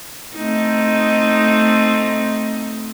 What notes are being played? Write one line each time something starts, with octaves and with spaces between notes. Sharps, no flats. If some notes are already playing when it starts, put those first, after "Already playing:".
A3 C4 D#4